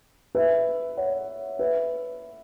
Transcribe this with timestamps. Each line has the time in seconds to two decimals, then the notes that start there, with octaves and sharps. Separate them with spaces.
0.35 B4 E5
0.97 C#5 F#5
1.59 B4 E5